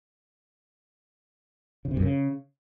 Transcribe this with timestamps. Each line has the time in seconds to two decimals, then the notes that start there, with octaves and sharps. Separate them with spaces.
1.85 C#3
1.91 C3
1.97 F#2
2.03 C#3